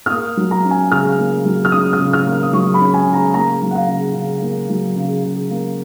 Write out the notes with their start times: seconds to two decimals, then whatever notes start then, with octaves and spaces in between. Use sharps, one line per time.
0.06 F6
0.10 A#3 D#6
0.37 F#3
0.51 A#5
0.64 C#4
0.71 G#5
0.91 C#3 F6
1.18 A#3
1.45 F#3
1.65 F6
1.72 C#4 D#6
1.93 F6
1.99 C#3
2.13 F6
2.26 A#3
2.43 D#6
2.53 F#3 C#6
2.74 B5
2.80 C#4
2.94 G#5
3.07 C#3
3.13 A#5
3.34 A#3 A#5
3.62 F#3
3.71 F#5
3.75 F5
3.88 C#3
4.15 C#3
4.41 A#3
4.70 F#3
4.96 C#3
5.23 C#3
5.50 A#3